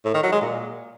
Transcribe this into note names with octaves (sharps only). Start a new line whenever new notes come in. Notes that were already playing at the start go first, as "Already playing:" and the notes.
A2
D#3
F#3
G#3
A#2